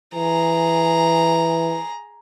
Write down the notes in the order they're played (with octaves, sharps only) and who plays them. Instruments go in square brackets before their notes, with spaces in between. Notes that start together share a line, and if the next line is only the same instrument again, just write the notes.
[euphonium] E3 [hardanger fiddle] G#4 A#5